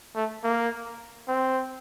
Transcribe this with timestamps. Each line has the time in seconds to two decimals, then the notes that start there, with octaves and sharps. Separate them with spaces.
0.16 A3
0.44 A#3
1.28 C4